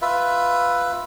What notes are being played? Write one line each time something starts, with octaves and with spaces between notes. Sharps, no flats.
F4 B4 E5